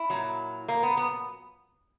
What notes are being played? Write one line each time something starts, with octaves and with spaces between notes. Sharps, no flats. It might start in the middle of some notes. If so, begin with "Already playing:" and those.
Already playing: E4
A#2 F#3
A#3
B3
B3